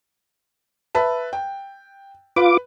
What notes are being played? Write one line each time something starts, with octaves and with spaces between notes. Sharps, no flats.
B4 E5 A5
G5
F4 B4 D6